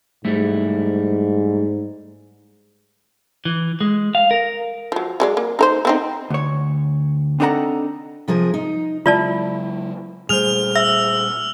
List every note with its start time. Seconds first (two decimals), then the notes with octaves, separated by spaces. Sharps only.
0.25 G#2 G3 A3 E4
3.45 E3
3.81 G#3
4.15 F5
4.31 A#4
4.92 F3 F#3
5.20 F#3 G#3 D5
5.37 A#3
5.59 D#4 A#4 C5
5.85 B3 C4 D#4
6.30 D2 C#5
7.40 C4 D4 D#4 A4 F#5 A#5
8.28 C3 F3 G#4 A#4
8.54 D#4
9.06 C#3 F#3 G#3 E4 F4 D5 A5
10.29 A#2 G3 A3 G#4 C5 F6 F7
10.75 E5 E6